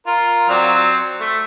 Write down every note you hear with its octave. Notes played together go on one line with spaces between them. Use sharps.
F4 A#4
F#3 C4 D5
A3